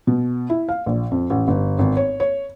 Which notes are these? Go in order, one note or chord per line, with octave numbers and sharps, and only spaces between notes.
B2
E4
F5
A#1
F2
A1
G1
G#1
C#5
C#5